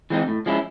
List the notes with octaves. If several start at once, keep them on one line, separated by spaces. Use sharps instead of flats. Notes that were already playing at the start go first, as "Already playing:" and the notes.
E3 G#3 C4 D#4
A2
F3 G#3 C#4 E4